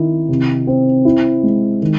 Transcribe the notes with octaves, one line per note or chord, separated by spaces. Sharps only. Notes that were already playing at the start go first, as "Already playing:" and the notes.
Already playing: D#3 E4
C3
C4
E4
G#3
D#3